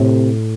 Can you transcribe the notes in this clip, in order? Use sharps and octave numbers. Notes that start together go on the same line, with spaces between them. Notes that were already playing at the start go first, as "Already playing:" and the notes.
Already playing: A2 C3